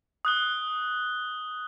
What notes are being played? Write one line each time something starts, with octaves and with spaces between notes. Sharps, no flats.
D#6 F#6 G7